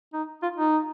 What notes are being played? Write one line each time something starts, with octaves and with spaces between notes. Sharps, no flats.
D#4
F4
D#4